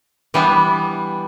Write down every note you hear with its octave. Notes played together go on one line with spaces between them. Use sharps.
E3 G3 B3 D4